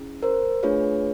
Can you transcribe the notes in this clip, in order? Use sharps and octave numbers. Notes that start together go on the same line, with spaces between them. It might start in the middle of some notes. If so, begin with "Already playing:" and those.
Already playing: C#4 E4 G#4
A#4 C5
A3 D4 F4 G#4 B4 C#5